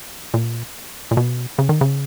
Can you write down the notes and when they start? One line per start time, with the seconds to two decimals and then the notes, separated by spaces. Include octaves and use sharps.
0.34 A#2
1.11 A#2
1.17 B2
1.59 C#3
1.69 D#3
1.81 C#3